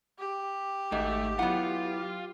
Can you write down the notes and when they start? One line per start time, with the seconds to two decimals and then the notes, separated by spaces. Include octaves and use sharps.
0.19 G4
0.92 G#1 G#2 A3 D#5 E5
1.39 F#3 B3 E4 F4 F#5